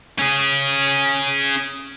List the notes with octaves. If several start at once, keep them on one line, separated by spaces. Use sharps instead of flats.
C#4 G#4